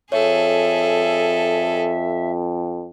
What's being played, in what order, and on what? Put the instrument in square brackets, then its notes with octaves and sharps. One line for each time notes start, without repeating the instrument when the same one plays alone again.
[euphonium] F2 [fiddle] G#4 A4 [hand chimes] C#5 [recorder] E5